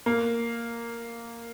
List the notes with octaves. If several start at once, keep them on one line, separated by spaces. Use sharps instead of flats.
A#3